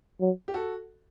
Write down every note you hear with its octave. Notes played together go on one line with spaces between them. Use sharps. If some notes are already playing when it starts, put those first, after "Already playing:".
F#3
G4
F#4 A4